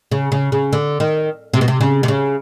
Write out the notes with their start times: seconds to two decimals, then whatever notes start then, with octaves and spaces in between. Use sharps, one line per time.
0.12 C#3
0.32 C#3
0.52 C#3
0.73 D3
1.00 D#3
1.54 C3
1.61 B2
1.68 C3
1.81 C#3
2.03 C3
2.08 C#3